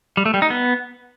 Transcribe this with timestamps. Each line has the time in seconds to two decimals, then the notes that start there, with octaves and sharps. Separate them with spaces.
0.17 G3
0.26 A3
0.34 G3
0.42 D#4
0.50 B3